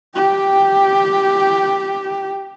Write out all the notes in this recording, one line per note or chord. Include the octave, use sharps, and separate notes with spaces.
G4 G5